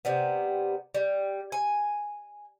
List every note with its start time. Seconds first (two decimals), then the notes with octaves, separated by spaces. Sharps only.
0.05 C3 G3 B3
0.95 G3
1.52 G#5